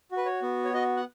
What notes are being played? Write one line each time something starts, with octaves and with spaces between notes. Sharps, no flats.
F#4
B4
C#5
B3
C#5
F#4 D#5
F#5